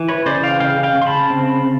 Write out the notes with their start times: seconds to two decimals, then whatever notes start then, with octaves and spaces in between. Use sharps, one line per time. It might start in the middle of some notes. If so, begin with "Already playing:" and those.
Already playing: E3
0.08 B4 C#5
0.26 C#3 C5 D5
0.43 F5 G5
0.60 C#3 F5 G5
0.83 F5 G5
0.95 C#3
1.02 C6
1.06 A5 B5
1.30 C4